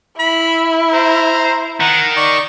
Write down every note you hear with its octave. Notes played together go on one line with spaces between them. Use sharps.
E4 B5
C5 A#5
D#3 F#5 A#5
D5 C#6